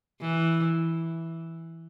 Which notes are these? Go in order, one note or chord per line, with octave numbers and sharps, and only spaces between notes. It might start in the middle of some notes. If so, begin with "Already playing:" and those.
E3